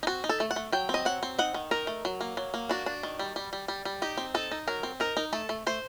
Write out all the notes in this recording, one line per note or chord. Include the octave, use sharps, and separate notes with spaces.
D#4
C4 F#4
D#4
A4
A3
F#5
A3
F#3 G5
C4
D#5
F#3 F#5
C4
D#4 F#5
D#3
D#4 A#4
A3
F#3
A#3
F#3
A#3
D4 F#4
D4
D#3
G3
G3
G3
G3
G3
D#4 G4
C4
D#4 A4
D#4
F#3 A#4
C4
D#4 A#4
D#4
A3 A4
A3
A3 C5